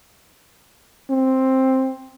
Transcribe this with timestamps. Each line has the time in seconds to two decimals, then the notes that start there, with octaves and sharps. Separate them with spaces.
1.10 C4